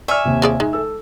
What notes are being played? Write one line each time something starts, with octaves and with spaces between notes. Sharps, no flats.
D5 E5 G#5 C#6 F6
D#2 C3
F3 G#4 D5
G#3 D#4
A4 E6